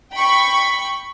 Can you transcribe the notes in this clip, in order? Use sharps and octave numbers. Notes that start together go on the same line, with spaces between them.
G5 B5 C#6